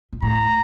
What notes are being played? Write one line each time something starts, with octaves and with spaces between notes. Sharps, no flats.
A#2
A2 A#5